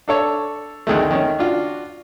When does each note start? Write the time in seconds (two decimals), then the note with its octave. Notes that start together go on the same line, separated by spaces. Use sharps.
0.08 D4 A4 C#5
0.87 D2 D#3 G#3 A3
1.11 D#3 C#4
1.39 D4 F4 F#4